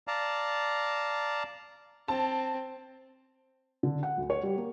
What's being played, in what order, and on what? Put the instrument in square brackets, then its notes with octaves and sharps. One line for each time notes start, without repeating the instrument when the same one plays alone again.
[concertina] D5 F5 A5 A#5
[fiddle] C4 [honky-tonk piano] A5
[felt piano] D3
F#5
D2
C#5
G3
A#3